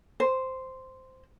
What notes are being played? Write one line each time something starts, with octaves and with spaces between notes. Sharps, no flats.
C5